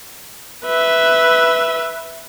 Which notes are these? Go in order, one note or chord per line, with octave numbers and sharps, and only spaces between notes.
B4 E5